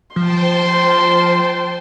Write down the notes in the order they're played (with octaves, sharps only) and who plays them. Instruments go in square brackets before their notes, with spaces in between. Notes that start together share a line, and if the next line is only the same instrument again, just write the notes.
[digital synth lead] F3 [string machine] C5 G5 A5 [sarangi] C6